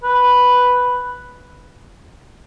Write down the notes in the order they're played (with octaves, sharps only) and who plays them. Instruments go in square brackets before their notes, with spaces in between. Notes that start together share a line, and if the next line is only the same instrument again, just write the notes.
[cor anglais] B4